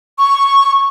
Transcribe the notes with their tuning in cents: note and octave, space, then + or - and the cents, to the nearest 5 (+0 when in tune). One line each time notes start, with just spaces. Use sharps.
C#6 -5